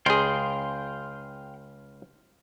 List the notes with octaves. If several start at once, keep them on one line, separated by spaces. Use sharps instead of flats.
C#2 G#4 F5 G5 C6